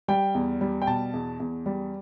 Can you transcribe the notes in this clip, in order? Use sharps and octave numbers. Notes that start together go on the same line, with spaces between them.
G3 G5
E2
G3
G5
B2 A5
E2
E2
G3